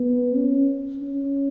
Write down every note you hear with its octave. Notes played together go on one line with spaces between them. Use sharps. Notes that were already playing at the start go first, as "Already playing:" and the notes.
Already playing: B3
C#4
C#4